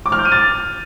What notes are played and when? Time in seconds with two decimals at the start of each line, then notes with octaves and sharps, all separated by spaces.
0.06 D6
0.12 F6
0.19 G6
0.25 D#7
0.32 A6